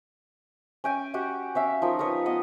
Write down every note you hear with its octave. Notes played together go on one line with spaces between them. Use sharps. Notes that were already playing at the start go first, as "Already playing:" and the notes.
C#4 G5 G#5
F#4 G4 F#5 G5
C#4 E5 F5
F3 D#4 A#4
A#4 B4 C#5 D#6
B3 D#5